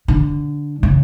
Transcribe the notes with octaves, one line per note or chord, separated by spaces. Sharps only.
D3
C#3